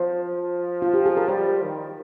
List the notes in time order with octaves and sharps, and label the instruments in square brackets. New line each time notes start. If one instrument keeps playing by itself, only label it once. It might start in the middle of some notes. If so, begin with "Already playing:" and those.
Already playing: [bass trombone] F3 [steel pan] C5
[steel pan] F4
G4
G#4
A#4
[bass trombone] G3 [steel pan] C5
[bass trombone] D#3